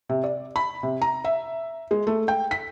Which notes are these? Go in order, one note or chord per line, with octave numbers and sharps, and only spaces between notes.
C3
D5
B5
C3
A#5
E5
G#3
A3
G5
B6